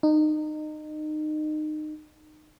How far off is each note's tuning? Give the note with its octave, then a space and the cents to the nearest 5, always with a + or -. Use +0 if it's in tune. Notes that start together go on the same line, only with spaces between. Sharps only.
D#4 -25